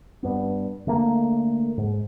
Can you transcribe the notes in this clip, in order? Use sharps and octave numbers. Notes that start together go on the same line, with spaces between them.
G2 B3
D3 A3 A#3
G#2